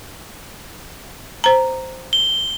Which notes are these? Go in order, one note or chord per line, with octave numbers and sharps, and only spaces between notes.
C5 A#5
G7